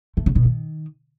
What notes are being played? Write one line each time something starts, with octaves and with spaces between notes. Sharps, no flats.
A3
C#3
B2
D#3